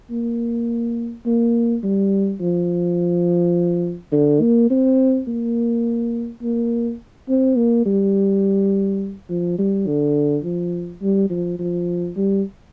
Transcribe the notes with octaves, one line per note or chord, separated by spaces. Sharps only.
A#3
A#3
G3
F3
D3
A#3
C4
A#3
A#3
C4
A#3
G3
F3
G3
D3
F3
G3
F3
F3
G3